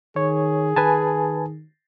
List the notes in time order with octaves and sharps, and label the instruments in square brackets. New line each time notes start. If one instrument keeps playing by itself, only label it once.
[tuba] D#3 [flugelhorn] G#4 [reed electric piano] C#5
[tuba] D#3 [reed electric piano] B4 G#5 A5